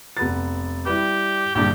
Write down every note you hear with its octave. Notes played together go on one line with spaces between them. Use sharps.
F1 B3 A6
G3 E4 G4 B4
A#1 G2 D3 G4